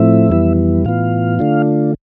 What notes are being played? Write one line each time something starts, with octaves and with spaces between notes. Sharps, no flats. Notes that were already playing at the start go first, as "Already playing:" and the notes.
Already playing: A2 F3 A3 C4 E4 E5
F2 E3 G3 B3 E4
A2 E3 B3 F4 F5
D3 A3 D4 F4